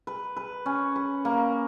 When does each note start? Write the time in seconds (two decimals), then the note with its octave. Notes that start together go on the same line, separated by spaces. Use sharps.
0.07 B4
0.37 B4
0.66 C#4
0.96 B4
1.25 A#3